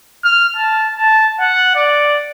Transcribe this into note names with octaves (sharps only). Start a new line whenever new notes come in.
F6
A5
A5
F#5
D5